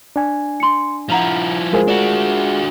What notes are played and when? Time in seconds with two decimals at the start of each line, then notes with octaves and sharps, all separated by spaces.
0.16 D4 G#5
0.60 C6 C#7
1.10 F3 E4 F#5 A#5 F7
1.73 G#3 F4 G#4 A#4 C5
1.88 D4 F#4